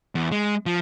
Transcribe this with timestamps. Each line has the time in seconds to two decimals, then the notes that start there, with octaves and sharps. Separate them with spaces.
0.15 E2
0.32 G#3
0.66 F3